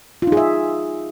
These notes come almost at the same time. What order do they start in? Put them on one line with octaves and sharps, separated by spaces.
F4 D#4 G#4 E5